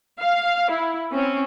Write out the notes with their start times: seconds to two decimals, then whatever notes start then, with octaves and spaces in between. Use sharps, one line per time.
0.19 F5
0.71 E4
1.13 C4 C#4